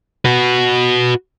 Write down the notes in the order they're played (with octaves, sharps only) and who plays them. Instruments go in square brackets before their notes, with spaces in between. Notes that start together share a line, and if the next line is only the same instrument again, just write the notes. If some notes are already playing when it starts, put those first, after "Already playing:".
[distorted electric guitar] F#4 B4